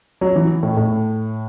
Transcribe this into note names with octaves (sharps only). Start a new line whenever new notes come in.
F#3
E3
A2
A2